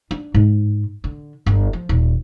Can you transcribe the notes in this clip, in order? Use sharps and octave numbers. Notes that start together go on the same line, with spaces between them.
D4
G#2
D3
G1
F3
D#1